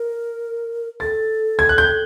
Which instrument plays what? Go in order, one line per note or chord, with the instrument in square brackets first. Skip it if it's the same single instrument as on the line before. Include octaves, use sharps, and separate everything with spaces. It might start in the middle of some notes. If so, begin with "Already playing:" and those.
Already playing: [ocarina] A#4
[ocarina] A4 [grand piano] A6
[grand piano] G#6
F#6
G6